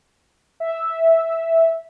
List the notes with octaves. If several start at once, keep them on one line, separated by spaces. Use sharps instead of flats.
E5